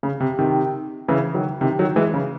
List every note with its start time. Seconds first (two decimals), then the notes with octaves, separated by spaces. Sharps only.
0.03 C#3
0.20 C3
0.39 C3 D#3
1.08 C#3 E3
1.35 D#3 F#3
1.61 C3 D#3
1.79 D#3 F#3
1.96 E3 G#3
2.14 C#3